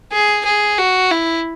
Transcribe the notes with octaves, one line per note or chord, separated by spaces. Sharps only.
G#4
G#4
F#4
E4